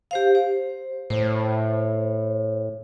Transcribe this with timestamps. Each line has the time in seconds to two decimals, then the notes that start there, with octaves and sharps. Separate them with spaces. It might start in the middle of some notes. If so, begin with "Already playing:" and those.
0.11 G4 C5 F5
0.35 C5
1.10 A2 C5